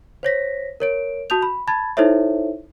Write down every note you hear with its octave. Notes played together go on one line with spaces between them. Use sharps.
C5 C#5 A#6 B6
A#4 C#5 D7
F#4 A5 D#6 G6 F7
B5
A5 B5 G#6 A6
D#4 E4 A4 C5 C#5 E5